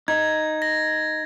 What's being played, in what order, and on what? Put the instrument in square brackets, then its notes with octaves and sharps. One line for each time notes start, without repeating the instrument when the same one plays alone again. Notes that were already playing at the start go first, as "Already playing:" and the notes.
[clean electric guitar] D#4 [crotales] G#6
[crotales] A#6